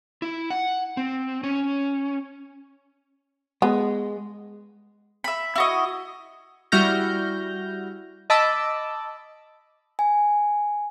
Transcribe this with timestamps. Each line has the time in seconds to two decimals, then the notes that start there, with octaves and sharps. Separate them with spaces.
0.22 E4
0.50 F#5
0.97 C4
1.43 C#4
3.62 G#3 B3
5.24 E5 B5
5.56 E4 F#4 D#5
6.72 G3 E4 F#4 F6 G6 A#6
8.30 D#5 A5 B5 D6 E6
9.99 G#5